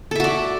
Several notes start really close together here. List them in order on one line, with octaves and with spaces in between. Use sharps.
A4 E5 F#4 D5